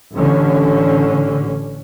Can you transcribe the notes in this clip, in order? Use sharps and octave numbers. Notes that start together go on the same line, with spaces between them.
A1 D3 C#4